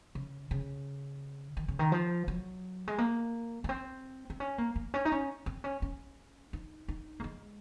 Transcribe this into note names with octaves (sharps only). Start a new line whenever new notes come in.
C#3
C#3
D#3
C#3
D#3
F3
F#3
G#3
A#3
A#3
C4
C4
C#4
A#3
A#3
C#4
D#4
C#4
C4
C#4
C#4
D#4
D#4
A#3
G#3